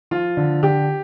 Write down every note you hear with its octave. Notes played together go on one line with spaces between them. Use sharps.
F3 F4
D3
D3 G4